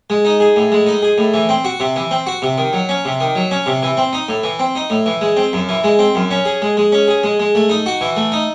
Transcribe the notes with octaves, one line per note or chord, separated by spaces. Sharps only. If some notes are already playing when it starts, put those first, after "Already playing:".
G#3
D#4
G#4
A2
G#3
D#4
G#4
A2
E3
C4
F#4
C3
E3
C4
F#4
C3
D#3
F#3
C#4
C3
D#3
F#3
C#4
C3
E3
C4
D#4
A2
E3
C4
D#4
A2
E3
G#3
C4
F#2
E3
G#3
C4
F#2
C#4
G#4
G#3
G#3
C#4
G#4
G#3
G#3
A3
D#4
F#4
E3
A3
D#4